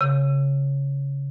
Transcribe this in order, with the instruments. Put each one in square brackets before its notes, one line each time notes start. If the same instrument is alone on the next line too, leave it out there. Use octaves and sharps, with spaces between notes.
[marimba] C#3